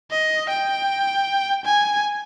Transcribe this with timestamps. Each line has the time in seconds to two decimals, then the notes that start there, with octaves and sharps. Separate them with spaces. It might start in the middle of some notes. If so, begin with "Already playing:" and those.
0.11 D#5
0.49 G5
1.65 G#5